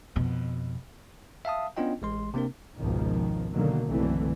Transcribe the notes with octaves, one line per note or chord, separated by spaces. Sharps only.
F2 B2
E5 F5 A5 D#6
B3 C#4 D4 F4 D#5 G5
A1 G#3 C6
C3 A#3 C4 D4 A#4
G#1 C#2 B2 D#3 F3
B2 D3 D#3 F#3 A#3
F#1 B1 D3 E3 A3 C4